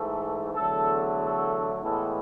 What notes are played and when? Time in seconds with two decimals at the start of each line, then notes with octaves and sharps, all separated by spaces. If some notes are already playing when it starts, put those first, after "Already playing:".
Already playing: G#2 E3 A3 A4
0.54 E2 D3 F#3 A3 A4
1.18 A4
1.81 A2 E3 G#3 B3 A4